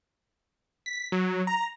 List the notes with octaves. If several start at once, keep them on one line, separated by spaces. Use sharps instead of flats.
B6
F#3
A#5